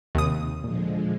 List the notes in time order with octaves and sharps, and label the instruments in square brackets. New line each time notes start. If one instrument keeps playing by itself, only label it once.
[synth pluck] D#2 D#6 [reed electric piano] C3
[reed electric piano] A#2 [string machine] D3 F3 G#3